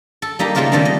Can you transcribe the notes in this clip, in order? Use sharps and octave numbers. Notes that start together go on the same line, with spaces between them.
A4
G3 A#3 D#4 G4
C#3 A3 A#3 F4 A#4 C5
D#3 G3 A3 A#3 C4 D4
D#5